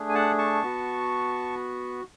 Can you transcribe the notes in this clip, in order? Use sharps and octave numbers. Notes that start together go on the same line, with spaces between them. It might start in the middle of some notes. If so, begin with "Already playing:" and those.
Already playing: A3 D4 G#4
G#5
F#5 A5
A5 C#6
B3 F#4